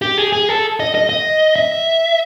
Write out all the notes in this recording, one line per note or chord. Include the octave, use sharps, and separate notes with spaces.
G4
G#4
G#4
A4
D#5
D#5
D#5
E5